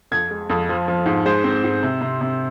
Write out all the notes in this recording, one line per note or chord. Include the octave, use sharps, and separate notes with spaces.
F2 G#6
G#3
F2
F3
F3
G#2
G#3 C5
C4
G#2
C3
C3
C3